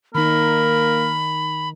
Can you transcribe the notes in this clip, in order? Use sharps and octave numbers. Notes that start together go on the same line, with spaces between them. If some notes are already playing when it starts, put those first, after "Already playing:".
D#3 A#3 D#4 A#4 B5